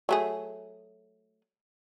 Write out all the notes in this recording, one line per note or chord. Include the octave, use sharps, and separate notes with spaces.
F#3 A3 G#4